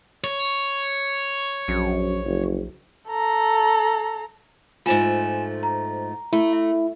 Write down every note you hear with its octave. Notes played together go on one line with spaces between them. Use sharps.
C#5
A#1 F#2
F#1
A4 A#5
G#2 F3 A3 F4 G#5 E7
A#5
A3 E4
E5